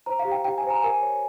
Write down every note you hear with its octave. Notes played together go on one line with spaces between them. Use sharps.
C5 A#5
F5
G4
G5
G4 G5
G#5
C5
A#5
A#4 G#5
C#5